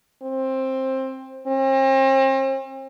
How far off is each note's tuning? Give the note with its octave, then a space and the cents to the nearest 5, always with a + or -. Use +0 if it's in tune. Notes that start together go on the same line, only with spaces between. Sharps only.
C4 +15
C4 +40